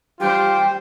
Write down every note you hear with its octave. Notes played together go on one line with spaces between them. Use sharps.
G3 F4 G4 C5 G5